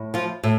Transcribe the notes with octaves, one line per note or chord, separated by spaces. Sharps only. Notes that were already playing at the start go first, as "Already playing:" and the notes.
Already playing: A2
F3 F4
A2